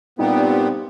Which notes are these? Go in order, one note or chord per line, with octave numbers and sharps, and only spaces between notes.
G2 A#2 G3 B3 C4 D#4 G4 A#4